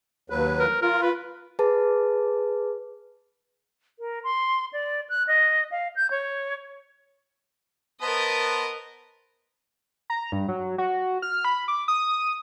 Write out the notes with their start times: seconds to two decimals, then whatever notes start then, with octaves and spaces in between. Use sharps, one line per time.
0.30 D#2 F#3 B4
0.59 A#4
0.82 F4 A#4
1.02 B4
1.59 G#4 B4 A5
3.99 A#4
4.24 C6
4.73 D5
5.09 F#6
5.27 D#5
5.71 F5
5.96 G6
6.11 C#5
8.02 B3 A#4 C5 D#5 A5
10.10 A#5
10.32 G2
10.49 F#3
10.78 F#4
11.22 F6
11.45 B5
11.68 D6
11.88 D#6